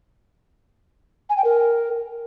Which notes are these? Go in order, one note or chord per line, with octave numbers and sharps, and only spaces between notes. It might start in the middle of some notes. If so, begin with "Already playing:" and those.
G#5
G5
A#4